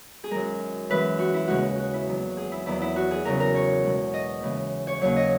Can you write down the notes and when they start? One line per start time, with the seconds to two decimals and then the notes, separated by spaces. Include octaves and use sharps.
0.24 G#4
0.31 F#2 D#3 G#3 A#4
0.90 F#2 E3 G#3 B4
1.19 F#4
1.34 E4
1.48 D#2 C#3 G#3 F#4
1.78 F#4
1.93 E4
2.07 E2 D#3 F#3
2.37 G#4
2.52 E4
2.66 E2 D#3 F#3 E4
2.81 E4
2.96 F#4
3.11 G#4
3.24 E2 C#3 F#3 A#4
3.40 A#4
3.55 C#5
3.84 E2 B2 G#3
4.14 D#5
4.41 D#2 C#3 E3 G#3
4.87 C#5
5.01 D#2 C#3 F#3 C#5
5.16 D#5